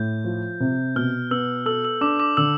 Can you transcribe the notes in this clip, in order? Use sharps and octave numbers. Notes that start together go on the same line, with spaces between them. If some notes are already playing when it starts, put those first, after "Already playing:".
Already playing: A2 G6
F3
C3
B2 F6
B3 E6
A4 E6
E6
D4 D6
D6
D3 E6